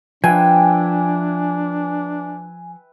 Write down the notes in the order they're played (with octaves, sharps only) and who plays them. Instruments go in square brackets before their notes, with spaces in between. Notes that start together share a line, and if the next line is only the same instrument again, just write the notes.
[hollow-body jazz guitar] F3 [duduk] D4 [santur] B4 E5 G5 [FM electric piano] G#5